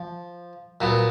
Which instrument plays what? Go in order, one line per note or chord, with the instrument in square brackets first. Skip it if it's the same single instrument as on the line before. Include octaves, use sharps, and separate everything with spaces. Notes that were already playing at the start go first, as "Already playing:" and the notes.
Already playing: [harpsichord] F3
A#2 F#3 B3